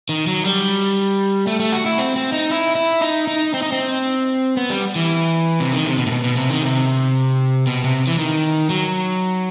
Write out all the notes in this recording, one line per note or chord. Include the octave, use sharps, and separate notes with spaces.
D#3
F#3
G3
A3
A3
F#4
E4
C4
C4
D#4
E4
E4
D#4
D#4
C4
D#4
C4
B3
G3
E3
C3
D#3
C3
B2
A2
B2
B2
C3
D#3
C3
B2
C3
E3
D#3
F#3